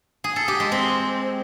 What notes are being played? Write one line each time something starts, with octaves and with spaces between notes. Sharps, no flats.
G#4
A4
G4
G#3
C4